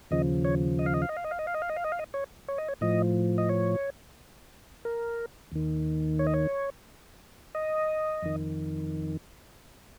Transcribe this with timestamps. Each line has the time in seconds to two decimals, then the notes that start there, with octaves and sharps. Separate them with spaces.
0.11 D#2 C#3 F3 D#5
0.45 C#5
0.79 D#5
0.86 F5
0.94 D#5
1.02 F5
1.09 D#5
1.17 F5
1.24 D#5
1.31 F5
1.39 D#5
1.47 F5
1.54 D#5
1.62 F5
1.69 D#5
1.76 F5
1.84 D#5
1.92 F5
1.99 D#5
2.14 C#5
2.48 C#5
2.58 D#5
2.68 C#5
2.81 A2 F3 D#5
3.38 D#5
3.49 C#5
4.85 A#4
5.52 D#2 D#3
6.19 C#5
6.27 D#5
6.34 C#5
7.55 D#5
8.22 F2 D#3